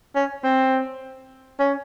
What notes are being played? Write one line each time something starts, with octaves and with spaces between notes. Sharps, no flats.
C#4
C4
C#4